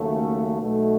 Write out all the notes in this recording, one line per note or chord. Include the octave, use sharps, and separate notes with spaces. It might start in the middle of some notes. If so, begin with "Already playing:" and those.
Already playing: D#2 C#3 F#3 A3
C#4
B1 B2 A3